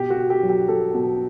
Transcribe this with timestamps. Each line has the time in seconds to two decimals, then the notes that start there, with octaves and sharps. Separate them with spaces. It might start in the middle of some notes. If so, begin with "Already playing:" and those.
Already playing: B2 G4
0.10 F#4
0.16 B2
0.30 G4
0.43 F#3
0.49 G4
0.68 F#3 A4
0.94 B2